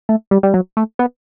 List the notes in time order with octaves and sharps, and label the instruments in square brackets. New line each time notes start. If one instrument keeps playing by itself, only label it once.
[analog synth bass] A3
G3
G3
F#3
A3
B3